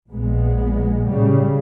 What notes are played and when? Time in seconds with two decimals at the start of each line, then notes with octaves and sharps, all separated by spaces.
0.11 A#1 A#2 G#3 B3
1.04 A2 C#3 G3